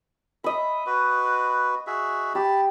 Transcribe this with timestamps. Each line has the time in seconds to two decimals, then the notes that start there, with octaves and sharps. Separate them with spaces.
0.44 D#5 E5 B5
0.86 F#4 B4
1.87 F#4 G#4 E5
2.35 G4 A5 B5